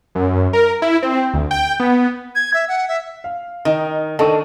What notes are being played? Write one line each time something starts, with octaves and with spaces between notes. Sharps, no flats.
F#2
A#4
E4
C4
D2
G5
B3
G#6
E5
F#5
E5
F5
D#3 D#4
D#3 D4 A4 C5 A5 C#6 D#7